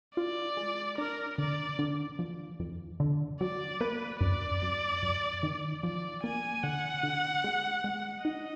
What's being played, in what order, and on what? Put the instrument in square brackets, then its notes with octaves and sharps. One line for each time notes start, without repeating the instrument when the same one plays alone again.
[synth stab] F4 [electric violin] D5
[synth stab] G#3
[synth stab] D4 [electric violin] A#4
[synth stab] D3 [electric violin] D5
[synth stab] D3
F3
F2
D3
[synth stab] F#3 [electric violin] D5
[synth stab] A#3 [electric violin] B4
[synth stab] F#2 [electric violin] D5
[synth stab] F#2
F#2
D#3
[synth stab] F3 [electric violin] D5
[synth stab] A#3 [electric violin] G#5
[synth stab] D3 [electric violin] F#5
[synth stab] D3
G#3
G#3
[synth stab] D#4 [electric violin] D#5